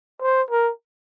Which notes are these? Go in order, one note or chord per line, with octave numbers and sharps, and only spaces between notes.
C5
A#4